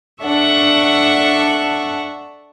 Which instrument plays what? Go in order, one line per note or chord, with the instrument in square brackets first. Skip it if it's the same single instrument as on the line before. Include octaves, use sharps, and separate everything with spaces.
[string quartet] D4 A4 E5 F#5 C#6